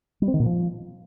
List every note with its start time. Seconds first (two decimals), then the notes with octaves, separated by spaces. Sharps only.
0.22 G3
0.28 C4
0.34 D#3
0.40 A#2
0.46 F3